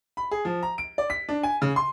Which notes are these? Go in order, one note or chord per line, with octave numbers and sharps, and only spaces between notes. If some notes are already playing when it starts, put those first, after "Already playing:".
B5
G#4
F3
A#5
D7
D5
B6
D4
G#5
C#3
C6